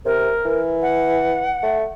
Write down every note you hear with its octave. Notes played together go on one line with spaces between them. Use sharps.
C3 A#4
E3
F#5
A3